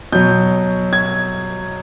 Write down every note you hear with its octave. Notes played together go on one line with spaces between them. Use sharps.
B2 F#3 G6
G#6